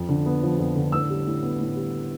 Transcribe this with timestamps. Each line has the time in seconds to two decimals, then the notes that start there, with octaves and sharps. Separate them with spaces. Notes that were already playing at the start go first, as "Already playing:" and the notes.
Already playing: F2
0.09 D3
0.26 B3
0.43 F3
0.59 F2
0.76 D3
0.92 A2 E6
1.10 G3
1.26 A2
1.43 B3
1.60 A2
1.76 G3